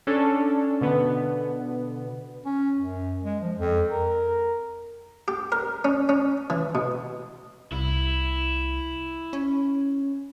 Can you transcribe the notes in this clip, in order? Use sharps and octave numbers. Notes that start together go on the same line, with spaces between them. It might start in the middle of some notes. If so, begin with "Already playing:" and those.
C#4 D4 A4
B2 D3 B3
C#4
F#2
G#3
F3
F2
A#4
G4
A#4
C#4
C#4
E3
B2
C2 E4
C#4